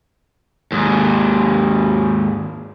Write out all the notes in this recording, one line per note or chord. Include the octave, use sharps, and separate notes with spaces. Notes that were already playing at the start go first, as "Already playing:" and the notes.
D#2 G#2